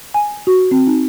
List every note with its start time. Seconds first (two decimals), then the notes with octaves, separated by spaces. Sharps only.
0.14 G#5
0.47 F#4
0.71 C4
0.87 D#4